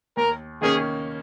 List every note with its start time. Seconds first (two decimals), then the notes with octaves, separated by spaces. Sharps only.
0.17 D#2 A#4
0.62 D#3 A#3 C#4 G#4